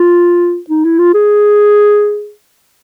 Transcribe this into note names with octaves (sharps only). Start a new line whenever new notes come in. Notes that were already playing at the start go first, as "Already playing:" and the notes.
Already playing: F4
D#4
E4
F4
G#4